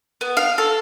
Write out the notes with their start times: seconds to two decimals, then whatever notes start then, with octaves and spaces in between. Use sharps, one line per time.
0.21 B3
0.37 F5
0.58 A4